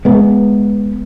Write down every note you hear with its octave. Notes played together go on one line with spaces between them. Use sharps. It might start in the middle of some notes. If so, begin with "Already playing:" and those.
G#3 B3